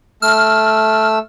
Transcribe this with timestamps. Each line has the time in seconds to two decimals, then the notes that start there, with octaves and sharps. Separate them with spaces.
0.22 A3 E6 F6